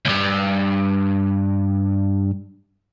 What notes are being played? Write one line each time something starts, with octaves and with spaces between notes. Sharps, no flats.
C#2 G2